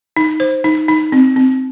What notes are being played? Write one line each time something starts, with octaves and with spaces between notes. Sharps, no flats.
D#4
C5
D#4
D#4
C4
C4